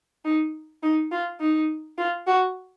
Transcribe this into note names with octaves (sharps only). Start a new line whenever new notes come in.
D#4
D#4
F4
D#4
F4
F#4